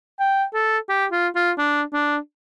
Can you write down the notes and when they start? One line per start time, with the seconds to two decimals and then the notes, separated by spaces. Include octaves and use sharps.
0.20 G5
0.54 A4
0.89 G4
1.12 F4
1.35 F4
1.58 D4
1.93 D4